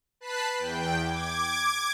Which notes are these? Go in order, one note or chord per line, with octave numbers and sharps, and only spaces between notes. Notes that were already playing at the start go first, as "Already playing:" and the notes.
B4 A5 B5 F#6 B6 C7
E2 G5
D6 G#6